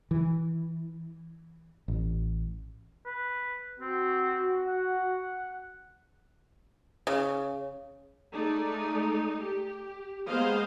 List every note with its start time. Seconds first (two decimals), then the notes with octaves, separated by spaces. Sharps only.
0.11 E3
1.88 A1
3.06 B4
3.80 C4 F#4
4.67 F#5
7.07 C#3
8.33 G#3 A3 D#4 D5
9.43 G4
10.26 G#3 A#3 B3 C5 D#5 F5